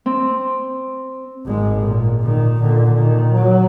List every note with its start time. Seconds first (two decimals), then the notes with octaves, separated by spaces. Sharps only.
0.06 C4
1.46 G#1 G#3
1.79 A#2
2.20 A#2 D#3
2.61 A#2 D3
2.97 D#3
3.33 F#3